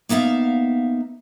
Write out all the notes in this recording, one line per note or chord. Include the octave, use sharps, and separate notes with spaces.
A#3 B3 D#4 E5 F5